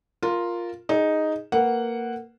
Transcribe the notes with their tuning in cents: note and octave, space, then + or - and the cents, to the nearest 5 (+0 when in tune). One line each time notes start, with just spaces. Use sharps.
F4 +0 A#4 +0
D#4 +0 G#4 +0
A#3 -15 B4 -15 F#5 +0